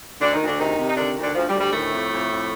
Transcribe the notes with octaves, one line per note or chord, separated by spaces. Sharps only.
D2 D3 D4
D#3 D#4
D2
D3 D4
C3 D#3 D#4
C3
D#4
D3 D#3 D4
D2
D3 D4
D2 F3
G3
D2
G3
A2 D#3 A3
F2
F2
F2